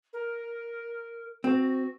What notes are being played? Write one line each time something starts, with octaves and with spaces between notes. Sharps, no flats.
A#4
C4 F#4